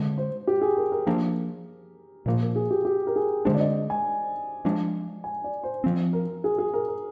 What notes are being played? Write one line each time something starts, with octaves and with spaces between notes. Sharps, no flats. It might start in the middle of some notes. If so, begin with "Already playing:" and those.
Already playing: D3 G#3 D4
C5
G4
G#4
A#4
A#4
F3 A#3 D4
A#2 F3 A#3 A#4
A#4
G#4
G4
G4
A#4
G#4
D3 G#3 D4 C5
D5
D#5
G#5
F3 G#3 D4
G#5
D5
C5
F3 C4
A#4
G#4
G#4
A#4
A#4